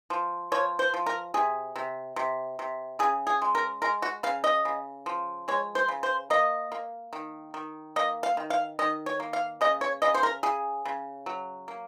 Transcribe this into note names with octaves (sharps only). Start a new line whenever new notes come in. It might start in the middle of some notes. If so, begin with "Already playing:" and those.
F3
F3 C#5
C5
F3
A#4
C3 G#4
C3
C3
C3
C#3 G#4
G#4
G#3
A#4
G#3 A#4
F#4
C#3 F5
D#5
C#3
F3
G#3 C#5
C5
C#3
C5
A#3 D#5
A#3
D#3
D#3
A#3 D#5
F5
D#3
F5
D#3 D#5
C#5
A#3
F5
C#3 D#5
C#5
C#3 D#5
C5
A#4
C#3 G#4
C#3
F#3
A#3